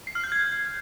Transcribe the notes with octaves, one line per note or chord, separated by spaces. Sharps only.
C7
F6
G6
G#6